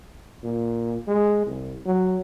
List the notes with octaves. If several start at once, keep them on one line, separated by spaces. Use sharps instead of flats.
A#2
G#3
C2
F#3